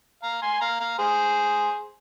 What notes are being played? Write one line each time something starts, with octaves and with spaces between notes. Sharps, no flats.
F5 A#5
G#5 C6
F5 A#5
F5 A#5
G#4 C5